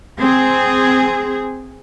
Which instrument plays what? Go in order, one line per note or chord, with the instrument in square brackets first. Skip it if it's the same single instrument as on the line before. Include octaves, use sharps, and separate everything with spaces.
[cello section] C4 G#4